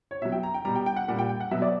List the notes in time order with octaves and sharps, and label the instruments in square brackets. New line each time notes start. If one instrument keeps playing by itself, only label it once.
[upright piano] C#5
B2 E5
F#3
G5
A#5
G5
B2 G3 A#5
G5
G5
F#5
A#2 G3 F#5
G5
G5
F#5
B2 F#3 E5
D5